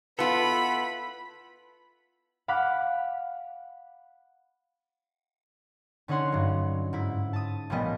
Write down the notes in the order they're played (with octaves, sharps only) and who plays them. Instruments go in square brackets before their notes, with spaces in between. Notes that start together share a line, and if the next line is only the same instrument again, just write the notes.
[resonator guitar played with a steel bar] B3 F4 [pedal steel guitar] E4 A4 [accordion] B4 [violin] B5
[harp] F5 F#5 B5 D6 B6
D3 C#4 D#4 C#5 F#5 C6
G2 F#3
G#2 E4
A5 D#6
A1 A#2 F3 G3 B3 D#5